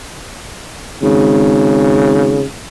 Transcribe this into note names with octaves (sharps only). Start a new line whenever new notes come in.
G#1 C#3